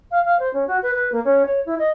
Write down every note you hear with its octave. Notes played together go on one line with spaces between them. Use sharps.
F5
F5
C5
C#4
F#4
B4
B4
A#3
C#4
C#5
E4
D#5